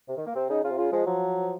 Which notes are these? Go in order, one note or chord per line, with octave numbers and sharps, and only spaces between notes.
C3
D#3
A#3
C3 C4
C#3 D#4
C#3 F4
C3
C#3 F4
F3 G#3
F3 F#3